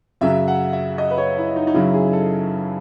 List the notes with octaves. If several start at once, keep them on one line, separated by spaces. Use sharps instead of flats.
F#2 C#3 F#3 E5
F#5
E5
D#5
B4
C#5
E4
D#4
D#4
F#2 C#3 F#3 E4
G#4
A4